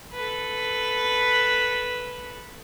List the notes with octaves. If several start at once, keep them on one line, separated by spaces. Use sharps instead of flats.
A4 B4